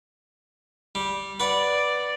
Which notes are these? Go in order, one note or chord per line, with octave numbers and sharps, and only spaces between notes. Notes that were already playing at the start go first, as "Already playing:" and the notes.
G3
B4 D5 F#5